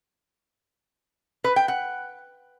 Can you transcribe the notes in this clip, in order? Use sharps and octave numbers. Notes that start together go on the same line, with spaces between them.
B4
G5
F#5